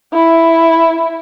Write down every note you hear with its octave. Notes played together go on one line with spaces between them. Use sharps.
E4